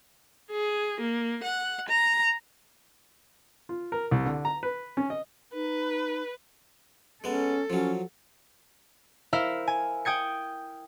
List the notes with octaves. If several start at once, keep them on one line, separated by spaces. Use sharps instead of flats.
G#4
A#3
F#5
A#5
F4
A#4
C2
D3
A#5
B4
C#4
D#5
D#4 B4
G#3 B3 C#4 A4
F3 F#3 C#4
E4 A#4 C5 E5 F5
G#5
G5 D#6 G#6 C#7